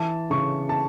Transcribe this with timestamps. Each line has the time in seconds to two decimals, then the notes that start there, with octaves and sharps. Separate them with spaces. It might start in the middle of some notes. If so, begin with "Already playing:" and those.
Already playing: E3 A5
0.30 C#3 C#6
0.69 A5